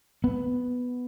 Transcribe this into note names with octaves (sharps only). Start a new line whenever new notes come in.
B3